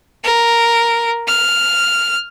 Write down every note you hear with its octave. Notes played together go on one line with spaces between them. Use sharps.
A#4
F6